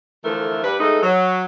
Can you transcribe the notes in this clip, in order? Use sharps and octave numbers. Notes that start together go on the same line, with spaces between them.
D3 E3 F3 A3 A#4
G2 B4
G#3 A3 B3 D#4 A4
F#3